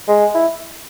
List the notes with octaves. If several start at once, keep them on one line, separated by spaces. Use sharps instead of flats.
G#3
E4